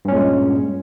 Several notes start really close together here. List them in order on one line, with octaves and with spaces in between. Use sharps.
G2 C#4 A#2 G#3